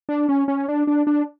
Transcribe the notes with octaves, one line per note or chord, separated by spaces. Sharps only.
D4
C#4
C#4
D4
D4
D4